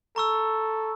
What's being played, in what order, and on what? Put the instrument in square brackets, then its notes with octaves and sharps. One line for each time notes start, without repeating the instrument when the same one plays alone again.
[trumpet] A4 [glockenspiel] A#5 C#6 E6